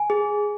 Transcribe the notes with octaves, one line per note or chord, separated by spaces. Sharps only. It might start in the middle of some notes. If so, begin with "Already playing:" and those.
Already playing: G#5
G#4